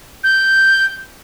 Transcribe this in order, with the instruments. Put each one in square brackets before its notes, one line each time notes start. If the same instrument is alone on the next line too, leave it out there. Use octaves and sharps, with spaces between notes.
[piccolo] G6